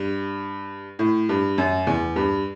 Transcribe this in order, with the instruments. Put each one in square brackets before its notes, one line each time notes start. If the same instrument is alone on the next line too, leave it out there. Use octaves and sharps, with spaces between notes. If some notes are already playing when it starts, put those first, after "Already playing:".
Already playing: [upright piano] G2
A2
G2
F#2
E2
G2